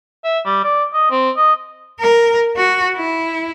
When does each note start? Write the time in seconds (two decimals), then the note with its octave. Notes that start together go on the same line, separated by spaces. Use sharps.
0.24 E5
0.45 G3
0.64 D5
0.94 D#5
1.11 C4
1.37 D#5
2.00 A#4
2.57 F#4
2.96 E4